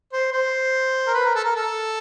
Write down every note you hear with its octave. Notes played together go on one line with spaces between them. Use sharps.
C5
C5
A#4
B4
A#4
A4
A#4
A4